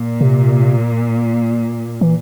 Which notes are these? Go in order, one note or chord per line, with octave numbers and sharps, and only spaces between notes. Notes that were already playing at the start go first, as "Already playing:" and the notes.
Already playing: A#2
C3
E3